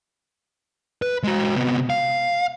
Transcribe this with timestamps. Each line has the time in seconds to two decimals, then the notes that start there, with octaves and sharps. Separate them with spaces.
1.02 B4
1.24 G#3 F#4
1.56 C3 B3
1.90 F5